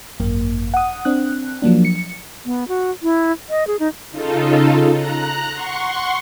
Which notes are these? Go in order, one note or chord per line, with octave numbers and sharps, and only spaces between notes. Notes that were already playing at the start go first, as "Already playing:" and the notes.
G#1 F#2 A#3
F#5 D#6
C4 D4 F#6
F3 F#3 A#3 D4
C#7
B3
F#4
E4
D#5
G#4
D#4
C#3 D#4 F4 A4
A#5 F#6
F#5 C6 C#6